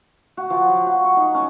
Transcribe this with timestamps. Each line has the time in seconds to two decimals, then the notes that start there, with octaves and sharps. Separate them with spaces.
0.37 F#4
0.50 F3
0.69 F#3
0.87 F#4
1.04 C#6
1.17 D#4
1.35 C#4